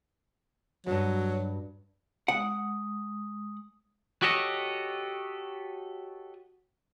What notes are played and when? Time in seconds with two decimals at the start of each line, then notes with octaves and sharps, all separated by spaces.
0.86 E2 G2 F#3
2.28 G#3 F#5 D#6
4.22 F#4 G4 A4 C#5 D#5